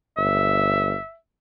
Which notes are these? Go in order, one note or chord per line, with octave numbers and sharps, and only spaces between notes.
G1 E5